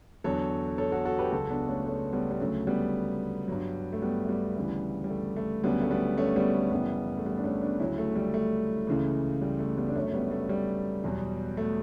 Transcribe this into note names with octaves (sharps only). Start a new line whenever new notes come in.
E2 D3 F#3 A4 C#5
A4 C#5
F#4 A4
F#4 A4
G4 B4
C#2 C#3 F#3 F#4 A4
B3 D4
A3 C#4
A3 C#4
G3 B3
G3
D2 C#3 F#3 A3
G3 B3
G2 F#3
A3
G3 B3
A3
G3 B3
D2 C#3 E3
G3
A3
A3
D2 C#3 F#3 G3 B3
A3
G3 B3
A3 C#4
G3 B3
A3
F#2 C#3 E3 G3 B3
A3
G3 B3
D4
A3 C#4
B3 D4
D2 C#3 F#3 C#4 E4
A3
G3
A3
C#2 C#3 E3
G3
A3
G3 B3
D4
F#2 D3 F#3 A3 C#4
G3 B3
A3
G3
E2 B2 F#3
A3